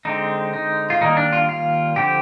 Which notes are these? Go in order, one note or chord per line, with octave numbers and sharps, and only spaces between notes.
D3 G#3 C4 D#4
D#4
F4
D#3 G3 A#3 D#4
D4
F4
F4
D3 F3 C4 G4